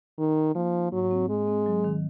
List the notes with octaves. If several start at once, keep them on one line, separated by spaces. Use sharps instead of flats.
D#3 D#4
D#4
F3 A#3
D#4
G#2 F#3
C4
G#3 C4
C4
F#3
D#3